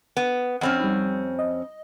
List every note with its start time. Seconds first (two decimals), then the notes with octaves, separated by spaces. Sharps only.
0.17 B3
0.61 F2 C4 C#4 F#5 B5
0.80 G3 D#4
1.39 D#5